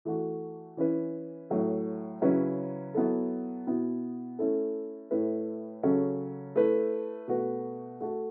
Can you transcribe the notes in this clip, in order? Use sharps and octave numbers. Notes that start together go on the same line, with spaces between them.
E3 A3 F#4
E3 C#4 E4 B4
A2 F#3 A3
C#3 F#3 C#4 E4 B4
F#3 B3 E4 A4
B2 B3 E4
A3 C#4 E4 A4
A2 A3 E4 B4
C#3 F#3 C#4 A4
A3 E4 B4
B2 A3 F#4 B4
A3 F#4 A4